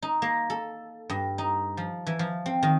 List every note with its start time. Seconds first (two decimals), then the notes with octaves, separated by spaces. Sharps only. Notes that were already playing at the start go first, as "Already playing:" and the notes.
0.02 D#4
0.22 A#3
0.50 A4
1.10 G2
1.38 D#4
1.77 F3
2.07 E3
2.19 F3
2.46 C4
2.63 D#3